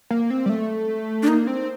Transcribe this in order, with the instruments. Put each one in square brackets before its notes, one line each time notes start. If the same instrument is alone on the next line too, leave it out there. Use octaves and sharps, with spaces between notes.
[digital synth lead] A#3
C4
G3
A3
[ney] D4
[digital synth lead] A#3 [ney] D#4
[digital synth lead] C4